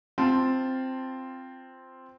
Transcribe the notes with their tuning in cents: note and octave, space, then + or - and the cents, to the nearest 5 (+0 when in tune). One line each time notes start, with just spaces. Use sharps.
C4 +0 F4 -5 A5 +5